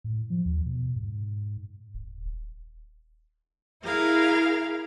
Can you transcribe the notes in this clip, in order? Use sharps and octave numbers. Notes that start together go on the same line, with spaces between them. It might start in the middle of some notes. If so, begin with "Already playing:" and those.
A2
F3
D#2
B2
G#2
D#1
E4 G#4 A#4 F5 A#5